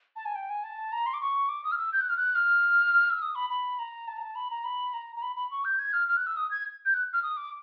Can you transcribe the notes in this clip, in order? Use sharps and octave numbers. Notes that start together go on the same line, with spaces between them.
A5
G#5
G5
G#5
A5
A#5
C6
D6
C#6
D6
D#6
F6
E6
G6
F#6
F6
F#6
F6
E6
D#6
B5
B5
A#5
A5
A#5
A5
B5
A#5
B5
A#5
A#5
B5
B5
C#6
G6
G#6
F6
F6
F#6
E6
D#6
G#6
G6
F#6
F6
D#6
D6